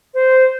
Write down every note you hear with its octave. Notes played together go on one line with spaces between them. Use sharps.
C5